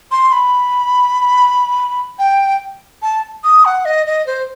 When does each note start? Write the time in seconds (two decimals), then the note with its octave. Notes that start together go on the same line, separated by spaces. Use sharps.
0.12 C6
0.32 B5
2.19 G5
3.02 A5
3.44 D#6
3.65 F#5
3.85 D#5
4.06 D#5
4.27 C5